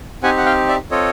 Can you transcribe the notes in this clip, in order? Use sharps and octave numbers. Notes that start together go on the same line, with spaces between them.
C4 D#4 G4 F#5 G#5
F#5
F5 G5
D5 E5
C4 F4 A4 C#5 D#5